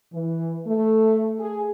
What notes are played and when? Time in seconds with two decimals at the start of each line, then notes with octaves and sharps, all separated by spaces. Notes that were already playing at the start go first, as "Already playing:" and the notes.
0.12 E3
0.66 A3
1.39 G#4